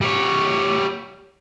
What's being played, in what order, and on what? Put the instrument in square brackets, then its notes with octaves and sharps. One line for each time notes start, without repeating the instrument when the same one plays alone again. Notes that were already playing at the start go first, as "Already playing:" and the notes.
[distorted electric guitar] G3 C#5